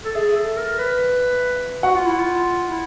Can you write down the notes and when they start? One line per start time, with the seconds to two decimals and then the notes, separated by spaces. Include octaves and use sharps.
0.05 A4
0.15 G#4 E5
0.36 A4
0.57 A#4
0.78 B4
1.83 F#4 F#5
1.95 F4
2.06 E4
2.19 F4
2.68 E4